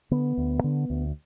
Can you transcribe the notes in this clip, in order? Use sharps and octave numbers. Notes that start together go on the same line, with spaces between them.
D3 B3
D2
D3
D2